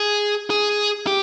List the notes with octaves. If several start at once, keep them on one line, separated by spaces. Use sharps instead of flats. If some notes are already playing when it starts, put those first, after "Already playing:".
Already playing: G#4
G#4
G4